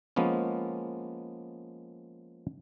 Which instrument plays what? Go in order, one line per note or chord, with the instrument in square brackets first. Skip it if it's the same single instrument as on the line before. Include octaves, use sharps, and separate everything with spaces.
[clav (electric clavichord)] F3 G#3 A#3 B3 C#4